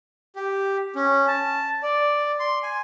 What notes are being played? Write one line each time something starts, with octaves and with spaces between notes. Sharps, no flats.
G4
C#4
A5
D5
C6
G#5